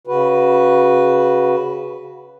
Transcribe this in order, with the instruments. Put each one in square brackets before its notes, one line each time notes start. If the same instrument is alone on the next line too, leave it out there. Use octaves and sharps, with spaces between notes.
[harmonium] C#3 F#4 B4